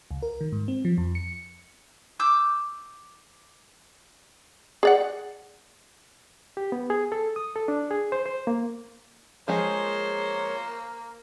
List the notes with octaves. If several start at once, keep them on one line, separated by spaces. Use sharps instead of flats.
C#2
A#4
D#3
G#2
C4
F3
F2
C#7
D6 E6 G6
G#4 D5 F#5
G4
B3
G#4
A4
D#6
A4
D4
G#4
C5
C5
A#3
F3 G#3 A#3 G#4 C5 C#5